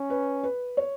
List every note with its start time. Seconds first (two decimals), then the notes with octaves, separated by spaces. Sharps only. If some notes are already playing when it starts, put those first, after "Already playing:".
Already playing: C#4
0.10 B4
0.43 B4
0.77 C#5